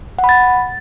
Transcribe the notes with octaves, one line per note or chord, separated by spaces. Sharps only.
F#5
B5
A6